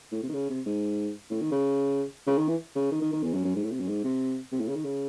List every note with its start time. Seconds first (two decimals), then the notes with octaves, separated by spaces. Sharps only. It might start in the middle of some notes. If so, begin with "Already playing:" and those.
0.12 A2
0.23 C3
0.29 D#3
0.34 C#3
0.49 C3
0.66 G#2
1.30 A2
1.41 D#3
1.51 C#3
2.27 C#3
2.38 D#3
2.48 E3
2.75 C#3
2.91 D#3
3.02 D#3
3.13 D#3
3.23 E2
3.34 F#2
3.44 F#2
3.56 G#2
3.63 A2
3.72 C3
3.80 F#2
3.88 G#2
4.04 C3
4.52 C3
4.60 A2
4.68 C#3
4.76 D#3
4.85 C#3